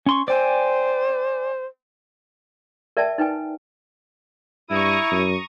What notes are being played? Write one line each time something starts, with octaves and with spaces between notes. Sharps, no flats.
C#4 C6 C#6
C5 D5 G5 G#5
A#4 D5 E5 G5 A5
D#4 B4 G5 G#5
G2 E4 A#5 C#6 D#6
F#2